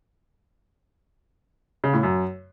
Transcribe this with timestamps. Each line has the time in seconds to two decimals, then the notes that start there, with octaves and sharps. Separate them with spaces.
1.84 C#3
1.93 A2
2.03 F#2